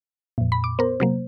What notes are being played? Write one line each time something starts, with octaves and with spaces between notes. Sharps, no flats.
F2 A#2
B5
D6
B3 A#4 C5
C3 F#3 A#3